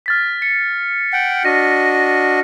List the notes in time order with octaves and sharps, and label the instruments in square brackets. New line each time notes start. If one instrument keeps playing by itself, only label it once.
[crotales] F6 A6 B6
C#7
[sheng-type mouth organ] F#5 G5
[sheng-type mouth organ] D4 F#4 D#5 [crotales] A#6 D#7